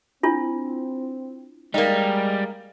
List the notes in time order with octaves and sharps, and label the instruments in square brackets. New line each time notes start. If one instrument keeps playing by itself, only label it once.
[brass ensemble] C4 [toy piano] D4 E4 F4
[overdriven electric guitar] G3 [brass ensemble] G#3 [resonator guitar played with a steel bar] A#3 D#4